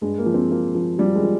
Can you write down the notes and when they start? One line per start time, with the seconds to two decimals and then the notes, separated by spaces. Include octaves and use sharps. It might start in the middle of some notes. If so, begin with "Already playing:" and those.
0.01 G2 G#3
0.18 A#3
0.26 F3
0.34 C4
0.50 F3 A#3
0.75 F3
0.99 F3 G3
1.15 G#3
1.23 F3